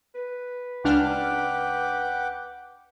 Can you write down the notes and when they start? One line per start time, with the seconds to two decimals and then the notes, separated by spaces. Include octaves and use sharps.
0.15 B4
0.84 C#2 D4 F#5 G5 D6 F6